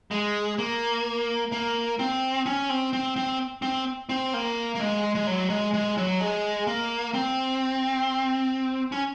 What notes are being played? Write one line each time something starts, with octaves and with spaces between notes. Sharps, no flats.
G#3
A#3
A#3
C4
C#4
C4
C4
C4
C4
C4
A#3
A#3
G#3
G#3
F#3
G#3
G#3
F#3
G#3
A#3
C4
C#4